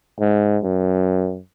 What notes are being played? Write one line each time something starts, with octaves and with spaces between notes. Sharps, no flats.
G#2
F#2